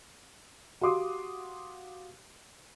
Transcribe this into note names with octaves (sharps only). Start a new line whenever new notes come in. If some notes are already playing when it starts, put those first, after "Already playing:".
F#4 G4 F5 C6 D6 D#6